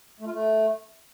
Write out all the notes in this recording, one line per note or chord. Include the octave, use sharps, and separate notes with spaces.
A3
F4
A3